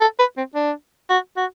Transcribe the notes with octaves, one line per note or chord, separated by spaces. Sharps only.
A4
B4
C4
D4
F#4
F#4